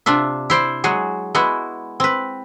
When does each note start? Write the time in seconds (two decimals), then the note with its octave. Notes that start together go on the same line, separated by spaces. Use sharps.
0.06 C3 D4 F4 E5
0.50 E4 C5 D5
0.84 F#3 G#3 F#4 G#4
1.35 G#3 B3 E4 F#4
2.00 C4 B4